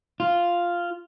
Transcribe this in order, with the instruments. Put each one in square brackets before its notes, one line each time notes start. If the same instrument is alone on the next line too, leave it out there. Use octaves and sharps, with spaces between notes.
[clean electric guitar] F4